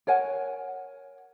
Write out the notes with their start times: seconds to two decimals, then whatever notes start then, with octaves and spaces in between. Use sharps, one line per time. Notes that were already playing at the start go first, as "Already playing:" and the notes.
0.07 A#4 C#5 F#5 G#5